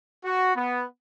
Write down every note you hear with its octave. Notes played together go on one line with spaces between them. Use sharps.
F#4
B3